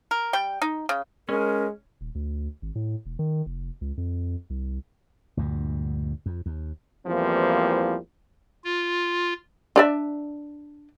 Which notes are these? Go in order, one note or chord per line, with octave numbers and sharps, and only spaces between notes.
A#4
G3 G5
D#4
C#3
G#3 C#4 A#4
D#1
D2
G#1
A2
E1
D#3
F1
C#2
F2
C2
D2 G2 A#2
F2
D#2
E2 E3 F3 G3 A#3 C4
F4
D4 D5 E5